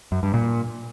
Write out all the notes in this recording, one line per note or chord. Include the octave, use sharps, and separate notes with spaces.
F#2
G2
A#2